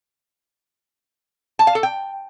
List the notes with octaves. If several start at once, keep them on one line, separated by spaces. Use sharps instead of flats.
A5
F5
A4
G5